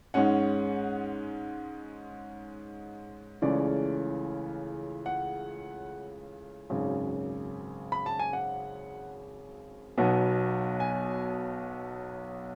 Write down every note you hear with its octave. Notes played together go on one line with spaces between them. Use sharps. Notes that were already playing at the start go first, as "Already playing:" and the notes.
G#2 G#3 C#4 F#5
C#2 C#3 E3 A3 C#4 D5
F#5
G#1 F#2 C#3
B5
A5
G#5
F#5
B1 B2 F#3 B3
G#5